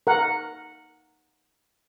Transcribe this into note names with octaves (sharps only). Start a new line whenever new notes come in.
A#4 F#5